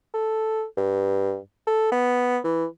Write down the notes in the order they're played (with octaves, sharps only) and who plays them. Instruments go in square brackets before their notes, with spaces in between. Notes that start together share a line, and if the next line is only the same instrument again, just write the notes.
[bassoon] A4
G2
A4
B3
E3